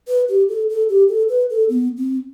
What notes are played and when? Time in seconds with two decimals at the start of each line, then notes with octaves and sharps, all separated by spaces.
0.08 B4
0.29 G4
0.49 A4
0.69 A4
0.89 G4
1.09 A4
1.29 B4
1.50 A4
1.69 B3
1.97 C4